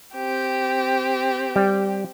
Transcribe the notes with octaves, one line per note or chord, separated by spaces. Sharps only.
C4 G4
G3